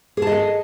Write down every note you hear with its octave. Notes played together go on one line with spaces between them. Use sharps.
G#4 A4 D#5 A5